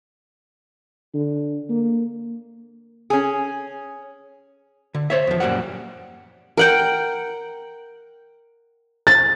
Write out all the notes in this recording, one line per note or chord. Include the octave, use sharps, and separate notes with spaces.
D3
A#3
C#4 G#4
D3
C5 C#5 E5
E2 F3
F#2 A#2 G3 F#5
A#4 F#5 G5
A6